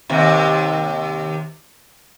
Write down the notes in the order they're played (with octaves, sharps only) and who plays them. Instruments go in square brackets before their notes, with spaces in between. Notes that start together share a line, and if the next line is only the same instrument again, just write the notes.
[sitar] D#2 C3